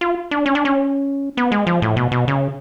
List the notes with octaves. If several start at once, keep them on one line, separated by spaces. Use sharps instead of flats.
F4
D4
C#4
D4
C#4
B3
G#3
F3
A2
B2
B2
C#3